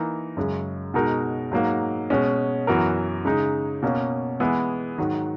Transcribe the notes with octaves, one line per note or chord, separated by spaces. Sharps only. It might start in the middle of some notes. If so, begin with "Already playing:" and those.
Already playing: E3 A#3 D#4 A#4
F#2 C#3 G#3
B2 G#3 D#4 F#4 A#4
G#2 F#3 A#3
B2 G#3 C#4
F#2 E3 B3 F#4 A#4
C#3 G#3 D#4
B2 A#3 C#4
E3 G#3 B3 E4 G#4
G#2 D#3 F#3